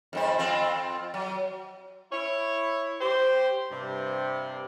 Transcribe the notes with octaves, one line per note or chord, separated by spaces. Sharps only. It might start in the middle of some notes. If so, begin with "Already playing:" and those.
F2 G#2 C5
F2 C4 F4
F#3
E4 C#5
G4 C5
G2 C3